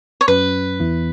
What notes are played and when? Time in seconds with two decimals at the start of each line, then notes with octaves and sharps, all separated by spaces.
0.21 C#5
0.28 F#2 F#3 C#4 B4
0.80 E2 E3 B3 E4